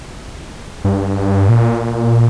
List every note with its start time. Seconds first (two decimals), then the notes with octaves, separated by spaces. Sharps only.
0.84 G2
1.49 A#2